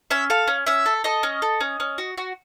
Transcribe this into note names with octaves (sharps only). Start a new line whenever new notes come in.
C#4 E5
A4 F5
C#4
C#4 E5
A4
A4 D#5
C#4
A4
C#4
C#4
F#4
F#4